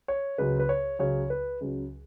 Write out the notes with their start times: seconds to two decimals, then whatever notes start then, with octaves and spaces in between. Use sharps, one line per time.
0.08 C#5
0.38 C#2 C#3 F#3 B4
0.59 B4
0.69 C#5
0.99 C#2 C#3 F#3 C#5
1.30 B4
1.61 C#2 C#3 F#3